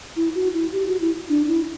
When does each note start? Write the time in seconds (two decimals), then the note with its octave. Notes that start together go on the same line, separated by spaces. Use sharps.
0.16 E4
0.35 F#4
0.53 E4
0.73 G4
0.87 F#4
1.01 E4
1.29 D4
1.48 E4